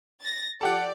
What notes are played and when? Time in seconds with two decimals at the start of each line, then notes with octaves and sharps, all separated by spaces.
0.21 A6 A#6
0.61 F3 G4 A4 D5 F#5 A5